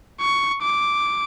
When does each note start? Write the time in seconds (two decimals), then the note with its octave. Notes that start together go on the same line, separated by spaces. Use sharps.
0.21 C#6
0.62 D6